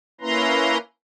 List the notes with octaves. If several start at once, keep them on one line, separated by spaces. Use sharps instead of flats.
A#3 C#4 E4 B4 A#5 C6